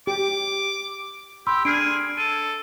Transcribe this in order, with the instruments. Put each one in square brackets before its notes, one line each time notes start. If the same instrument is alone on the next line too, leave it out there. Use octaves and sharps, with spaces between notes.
[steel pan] G4 [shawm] D6
[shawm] G4 [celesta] B5 C6 E6
[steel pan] D4 [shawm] G#4 [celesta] F6 C7 D7
[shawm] A4 [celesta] D#7